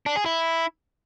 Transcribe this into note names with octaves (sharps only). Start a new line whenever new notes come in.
D4
G#4
E4